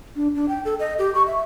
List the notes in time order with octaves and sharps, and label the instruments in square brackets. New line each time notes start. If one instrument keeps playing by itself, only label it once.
[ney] D4
D4
G5
A4
D#5
G4
C#6
E5